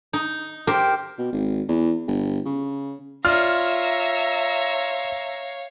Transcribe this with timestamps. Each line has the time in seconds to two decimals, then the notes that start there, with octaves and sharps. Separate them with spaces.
0.13 D#4
0.67 G4 A#4 C5
1.18 B2
1.32 G#1
1.68 E2
2.07 G1
2.46 C#3
3.25 F4 C#5 D5 E5 F5 A#5 F6